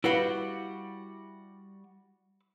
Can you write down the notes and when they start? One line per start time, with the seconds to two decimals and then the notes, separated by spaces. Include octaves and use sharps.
0.04 G3 E4 F#4 B4 F5